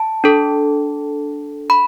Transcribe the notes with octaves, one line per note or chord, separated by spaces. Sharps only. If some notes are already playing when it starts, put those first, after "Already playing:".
Already playing: A5
D4 A4
B5